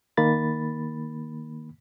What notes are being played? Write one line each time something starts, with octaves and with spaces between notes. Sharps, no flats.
D#3 A#3 B5 A6